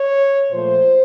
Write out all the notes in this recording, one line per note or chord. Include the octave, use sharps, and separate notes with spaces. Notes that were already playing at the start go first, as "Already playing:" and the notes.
Already playing: C#5
A#2 F3 A3 C5